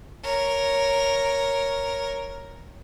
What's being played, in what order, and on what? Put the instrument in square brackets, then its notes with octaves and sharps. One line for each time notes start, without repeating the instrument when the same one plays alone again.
[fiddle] A#4 C#5